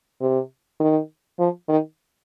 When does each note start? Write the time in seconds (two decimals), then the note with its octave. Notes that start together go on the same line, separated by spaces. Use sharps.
0.21 C3
0.80 D#3
1.39 F3
1.69 D#3